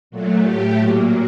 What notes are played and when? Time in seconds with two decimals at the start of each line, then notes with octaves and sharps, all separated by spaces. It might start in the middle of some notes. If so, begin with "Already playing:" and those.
0.11 A#2 F#3 A3
0.43 A2 A3 G4
0.77 A#2 F#3 A#3